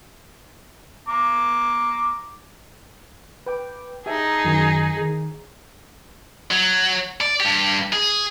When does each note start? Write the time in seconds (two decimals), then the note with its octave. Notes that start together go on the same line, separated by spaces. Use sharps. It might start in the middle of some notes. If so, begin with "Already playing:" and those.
1.09 A#5 D6
3.46 B4 G5 D6
4.06 D#4 G4 G#4 E5 A5
4.44 F#2 D#3 F#4
4.97 D#3 G#4
6.51 F#3
7.21 D5
7.40 G2 G4
7.93 G#4